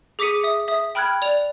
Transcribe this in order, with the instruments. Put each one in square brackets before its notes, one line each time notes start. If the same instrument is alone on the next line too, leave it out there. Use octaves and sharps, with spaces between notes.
[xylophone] G#4 D6 D#6 B6 C#7 D#7
E5 D#6
E5 D#6
G5 B5 F6 F#6 G#6
D5 F7